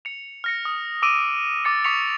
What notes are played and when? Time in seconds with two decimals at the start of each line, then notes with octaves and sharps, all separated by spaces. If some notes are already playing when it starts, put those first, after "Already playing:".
0.05 C#7 F7
0.44 F6 A#6 C#7
0.65 D#6
1.02 D6 E6 D7 D#7
1.64 D6 A6 C#7 D#7
1.84 C#6 D#6 B6 C#7 F7